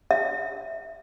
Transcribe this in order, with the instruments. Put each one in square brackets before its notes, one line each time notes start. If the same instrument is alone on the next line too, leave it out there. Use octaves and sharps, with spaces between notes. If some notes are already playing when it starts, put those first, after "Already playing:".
[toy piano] E5